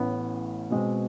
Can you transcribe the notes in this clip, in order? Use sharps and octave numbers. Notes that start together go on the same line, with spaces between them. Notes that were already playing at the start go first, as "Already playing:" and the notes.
Already playing: A1 A2 E3 A3 B3 C#4
B2 G#3 C4